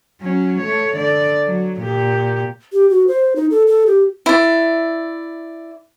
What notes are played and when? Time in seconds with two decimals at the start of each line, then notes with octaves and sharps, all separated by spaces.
0.21 F#3 C#4
0.61 A3 C#5
0.97 D3 D5
1.47 F#3
1.82 A#2 G4
2.73 G4
2.90 F#4
3.08 C5
3.36 D#4
3.51 A4
3.67 A4
3.86 G4
4.26 E4 D5